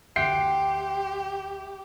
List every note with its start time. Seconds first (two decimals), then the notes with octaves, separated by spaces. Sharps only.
0.16 D2 G4 E5 F#5 G5 C6 C7